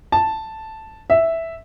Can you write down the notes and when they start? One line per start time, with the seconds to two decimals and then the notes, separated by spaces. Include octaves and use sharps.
0.12 A5
1.10 E5